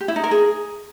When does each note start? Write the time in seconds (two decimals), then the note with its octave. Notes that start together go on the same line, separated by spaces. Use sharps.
0.01 G4
0.08 E4
0.16 D#4
0.24 A#4
0.31 G#4